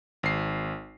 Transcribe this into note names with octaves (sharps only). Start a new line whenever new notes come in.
G#1 C7